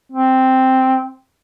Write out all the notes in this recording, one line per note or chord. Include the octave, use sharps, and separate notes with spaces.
C4